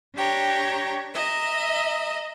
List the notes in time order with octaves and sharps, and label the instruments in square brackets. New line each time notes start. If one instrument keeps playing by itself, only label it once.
[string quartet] D4 G4 C#5 G5 A#5
D#5 E5 A#5